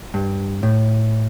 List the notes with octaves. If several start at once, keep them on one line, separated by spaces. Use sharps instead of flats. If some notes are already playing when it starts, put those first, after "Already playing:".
G2
A2